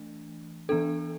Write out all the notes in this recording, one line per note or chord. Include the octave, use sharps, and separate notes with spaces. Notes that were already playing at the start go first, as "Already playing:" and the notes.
Already playing: E3 A3 D4
E3 B3 D4 A4